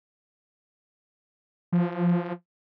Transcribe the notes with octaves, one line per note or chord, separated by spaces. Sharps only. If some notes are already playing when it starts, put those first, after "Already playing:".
F3